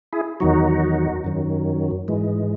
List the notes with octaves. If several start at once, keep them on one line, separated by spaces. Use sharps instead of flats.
E4 G#4
E2 D#3 F#3 D#4 F#4
F#2 D#3 F#3
G#2 E3 G#3